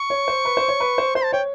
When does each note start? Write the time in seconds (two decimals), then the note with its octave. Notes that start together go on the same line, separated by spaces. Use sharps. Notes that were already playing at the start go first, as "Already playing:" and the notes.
Already playing: C#6
0.10 C#5
0.28 C5
0.45 B4
0.57 C5
0.68 C#5
0.80 B4
0.98 C5
1.15 C5 C6
1.24 A5
1.32 C#5 G5